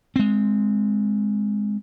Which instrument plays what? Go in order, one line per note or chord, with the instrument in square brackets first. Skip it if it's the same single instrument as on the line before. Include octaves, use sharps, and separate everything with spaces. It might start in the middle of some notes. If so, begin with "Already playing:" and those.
[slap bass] G#3 C4